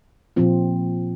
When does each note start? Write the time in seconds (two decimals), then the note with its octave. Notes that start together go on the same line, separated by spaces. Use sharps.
0.36 A#2 F3 C4 F4